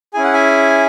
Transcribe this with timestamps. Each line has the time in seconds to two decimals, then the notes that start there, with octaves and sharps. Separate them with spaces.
0.14 C#4 E4 G#4 G#5
0.24 F#5
0.33 E5 G#5